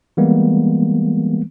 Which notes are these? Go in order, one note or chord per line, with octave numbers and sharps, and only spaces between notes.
E3 G3 G#3 A#3 B3